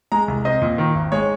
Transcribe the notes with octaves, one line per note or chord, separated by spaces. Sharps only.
G#3 A#5
C2
C4 D#5
A#2
D#3
G#1
G#3 C#5